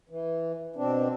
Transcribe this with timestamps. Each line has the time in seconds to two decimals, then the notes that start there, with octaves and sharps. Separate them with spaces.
0.09 E3
0.76 B2 C4 D4